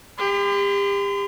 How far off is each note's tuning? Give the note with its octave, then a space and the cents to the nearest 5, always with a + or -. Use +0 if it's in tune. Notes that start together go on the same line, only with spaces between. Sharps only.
G4 +35 C6 -40